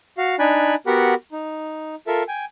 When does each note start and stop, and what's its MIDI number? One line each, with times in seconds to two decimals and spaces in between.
0.18 0.36 66
0.18 0.36 77
0.39 0.75 62
0.39 0.75 63
0.39 0.75 74
0.39 0.75 80
0.39 0.75 83
0.39 0.75 90
0.87 1.14 59
0.87 1.14 66
0.87 1.14 67
0.87 1.14 70
0.87 1.14 78
0.87 1.14 83
1.32 1.95 63
2.07 2.23 65
2.07 2.23 69
2.07 2.23 70
2.07 2.23 76
2.28 2.45 79
2.28 2.45 80